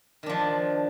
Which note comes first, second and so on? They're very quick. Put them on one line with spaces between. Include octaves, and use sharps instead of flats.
D#3 D4 F3